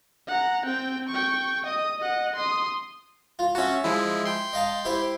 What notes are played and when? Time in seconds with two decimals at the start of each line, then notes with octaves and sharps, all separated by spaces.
0.28 F#5 A#5
0.66 C4 G5
1.09 G5 C#6
1.65 D#5 D#6
1.98 D#5 F#5
2.36 C6 D#6
3.39 F4
3.55 C#4 F#4 E5 A5
3.84 F3 G#3 E4
4.25 G5 C6
4.53 D#5 F5 A5
4.85 E4 G4 C5